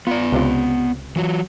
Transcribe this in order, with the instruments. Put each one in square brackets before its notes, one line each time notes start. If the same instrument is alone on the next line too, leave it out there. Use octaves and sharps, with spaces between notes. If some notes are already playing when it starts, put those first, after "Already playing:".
[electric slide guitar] B3 D5 [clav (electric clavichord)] F4
[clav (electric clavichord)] C#2 C3 F4
[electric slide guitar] E3 F#3